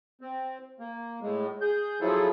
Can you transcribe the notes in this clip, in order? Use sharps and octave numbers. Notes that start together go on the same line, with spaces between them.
C4
A#3
A2 G#3
G#4 G6
F3 F#3 E4 F4 G#4 A4